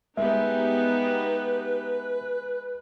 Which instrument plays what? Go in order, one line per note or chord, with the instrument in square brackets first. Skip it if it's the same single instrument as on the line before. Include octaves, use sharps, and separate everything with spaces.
[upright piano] G#3 [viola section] B3 D#4 G4 [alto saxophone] B4 [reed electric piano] E5